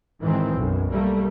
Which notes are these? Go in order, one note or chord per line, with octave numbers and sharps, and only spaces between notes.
G#2 D#3 E3 C4
B1 F#2
G3 A3 A#3